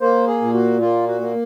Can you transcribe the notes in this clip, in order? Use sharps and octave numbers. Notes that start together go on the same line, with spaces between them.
A#3 C5
G#4
A#2
F#4
A#3 F4
F#4
A#3